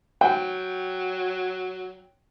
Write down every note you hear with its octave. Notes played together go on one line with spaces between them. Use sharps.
F#3 G5